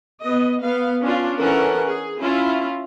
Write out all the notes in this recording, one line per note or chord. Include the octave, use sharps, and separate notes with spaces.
B3 D#5
B3 F5
C#4 D4 F4
E3 C#4 A4 A#4 F#5
G#4
C#4 E4 F4